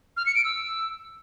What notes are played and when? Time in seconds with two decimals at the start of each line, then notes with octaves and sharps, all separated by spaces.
0.17 F6
0.26 C#7
0.35 D7
0.44 E6